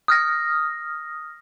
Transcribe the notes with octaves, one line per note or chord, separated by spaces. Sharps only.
D#6 F6 A#6